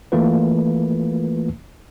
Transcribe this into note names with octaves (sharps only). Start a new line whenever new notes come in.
E3 A3 A#3 F4 B4